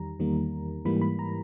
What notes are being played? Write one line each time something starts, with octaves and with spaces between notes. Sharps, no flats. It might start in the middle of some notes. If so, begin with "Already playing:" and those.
Already playing: E2 D#3 G3 A#5
E2 D#3 G3 A#3
G#2 E3 G3 A#3 B5
B5
A#5